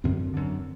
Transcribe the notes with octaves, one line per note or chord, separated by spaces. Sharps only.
F#2 D3 C4
F#2 D3